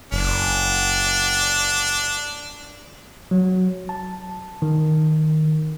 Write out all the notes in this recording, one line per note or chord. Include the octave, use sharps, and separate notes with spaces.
F#1 D4
F#3
A5
D#3